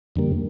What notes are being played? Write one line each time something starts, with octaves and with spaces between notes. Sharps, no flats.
F2 D3 G3 A#3